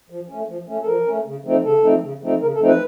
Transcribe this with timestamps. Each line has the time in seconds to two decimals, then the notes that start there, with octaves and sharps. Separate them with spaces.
0.10 F3
0.29 A3 C#4
0.48 F3
0.68 A3 C#4
0.82 A4
0.86 F3 A#4
1.06 A3 C#4
1.26 C#3
1.45 F3 A3 C4 D#4
1.64 C#3 A4
1.84 F3 A3 C4 D#4
2.03 C#3
2.22 F3 A3 C4 D#4
2.42 C#3 A#4
2.55 A4
2.61 F3 A3 C4 D#4
2.67 B4